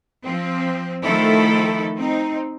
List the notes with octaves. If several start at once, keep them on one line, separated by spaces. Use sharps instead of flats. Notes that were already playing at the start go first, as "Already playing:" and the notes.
F3 C4
D#3 F3 A3 E4 A4
C4 D#4